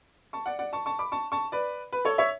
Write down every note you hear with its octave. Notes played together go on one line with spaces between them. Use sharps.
A5 C#6
D5 F#5
D5 F#5
A5 C#6
A5 C#6
B5 D6
A5 C#6
A5 C#6
B4 D5
B4
A4 C#5
C#5 E5